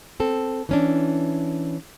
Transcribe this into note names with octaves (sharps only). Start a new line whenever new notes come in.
C4 A4
E3 C#4 D4